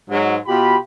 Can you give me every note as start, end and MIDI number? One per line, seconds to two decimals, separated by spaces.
0.10 0.36 44
0.10 0.36 54
0.46 0.76 47
0.46 0.76 65
0.46 0.76 67
0.46 0.76 83